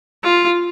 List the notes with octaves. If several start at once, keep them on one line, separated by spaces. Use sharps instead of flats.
F4